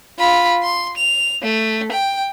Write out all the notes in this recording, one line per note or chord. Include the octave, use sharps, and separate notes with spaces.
F4 B5
C6
F7
A3
G5